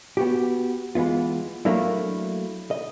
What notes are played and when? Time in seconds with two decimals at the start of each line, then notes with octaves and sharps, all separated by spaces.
0.17 B3 F#4 G4
0.95 E3 G#3 B3 F4
1.65 F#3 A3 A#3 D4 E4
2.71 D#5